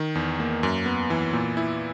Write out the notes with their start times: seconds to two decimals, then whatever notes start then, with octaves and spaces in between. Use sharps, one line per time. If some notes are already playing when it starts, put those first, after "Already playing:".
Already playing: D#3
0.15 E2
0.40 A#3
0.63 F#2
0.86 B3
1.10 E3
1.33 A#2
1.57 E4